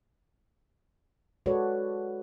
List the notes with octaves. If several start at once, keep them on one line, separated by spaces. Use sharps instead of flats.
G#3 F#4 A4 B4 C#5 D5